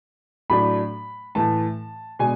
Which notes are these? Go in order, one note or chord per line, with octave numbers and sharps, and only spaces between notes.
A2 F#3 A3 D4 B5
A2 E3 A3 A5
B2 G#3 D4 G#5